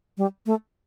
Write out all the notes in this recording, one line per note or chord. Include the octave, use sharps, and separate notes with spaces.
G3
A3